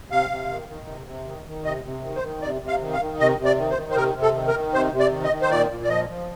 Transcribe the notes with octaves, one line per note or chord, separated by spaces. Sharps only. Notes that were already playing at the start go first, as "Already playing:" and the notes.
C3 F5
C3
D#3
D#3
C3
C3
D#3
D#3
C3 D#5
C3
D#3
C5
D#3
C3 D5
C3
F5
D#3
F5
D#3
C3 D#5
C3
D5
D#3
C5
D#3
C5
C3 A#4
C3
A4
D#3
A#4
D#3
C3 C5
C3
D5
D#3
D#5
D#3
C5
A#2 D5
A#2
D5
F3 D#5
F3